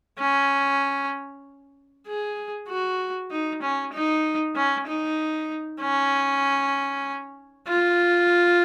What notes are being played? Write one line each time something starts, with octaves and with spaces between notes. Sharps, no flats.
C#4
G#4
F#4
D#4
C#4
D#4
C#4
D#4
C#4
F4